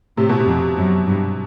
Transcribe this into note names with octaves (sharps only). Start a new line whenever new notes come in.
A2 C3
B2
C3
F2
F#2
G2